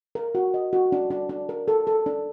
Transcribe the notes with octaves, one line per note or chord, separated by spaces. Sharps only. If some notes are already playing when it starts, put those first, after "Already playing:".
A#4
F#4
D#5
F#4
D4
D4
D4
A#4
A4
A4
D4